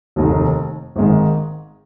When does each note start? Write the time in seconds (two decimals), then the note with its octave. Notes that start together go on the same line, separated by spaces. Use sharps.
0.16 F1 D#2 D#3
0.96 G#1 G#2 D#3 G#3